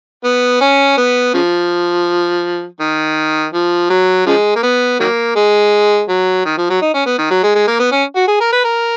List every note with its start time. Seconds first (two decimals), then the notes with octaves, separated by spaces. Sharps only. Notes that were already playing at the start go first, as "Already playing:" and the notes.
0.24 B3
0.61 C#4
0.97 B3
1.34 C#3 F3
2.80 D#3
3.53 F3
3.90 F#3
4.26 C#3 F3 G#3
4.56 A#3
4.63 B3
5.00 D#3 F#3 A#3
5.36 G#3
6.09 F#3
6.45 D#3
6.57 F3
6.70 F#3
6.82 D#4
6.94 C#4
7.06 B3
7.18 D#3
7.30 F#3
7.43 G#3
7.55 G#3
7.67 A#3
7.79 B3
7.92 C#4
8.16 F#4
8.28 G#4
8.40 A#4
8.52 B4
8.64 A#4